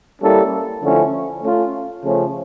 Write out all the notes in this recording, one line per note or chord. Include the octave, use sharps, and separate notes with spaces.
G3 A#3 C#4 E4 A4
D3 F3 A3 C#4 E4
A3 C#4 F4
C#3 F3 A3 C#4